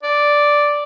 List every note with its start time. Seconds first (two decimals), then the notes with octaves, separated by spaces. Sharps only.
0.03 D5